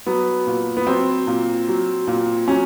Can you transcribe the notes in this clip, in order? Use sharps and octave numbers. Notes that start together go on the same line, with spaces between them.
F#3 B3
A#2
B3
F#3 C4
A#2
F#3
A#2
F#3 C#4